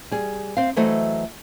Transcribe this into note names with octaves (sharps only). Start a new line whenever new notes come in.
G3 G#4
C4 F5
E3 F#3 A3 A4 C5 D#5